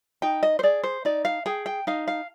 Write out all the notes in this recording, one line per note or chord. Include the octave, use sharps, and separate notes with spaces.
D#4 G5
D#5
C5
G#4 D5
C5
D#4 D5
F5
G#4 G5
G5
D#4 F5
F5